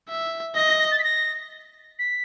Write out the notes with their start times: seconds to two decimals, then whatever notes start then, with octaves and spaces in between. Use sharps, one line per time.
0.09 E5
0.56 D#5 A#6
0.68 A#6
0.80 A#6
0.92 A6
0.99 B6
1.03 A#6
1.99 B6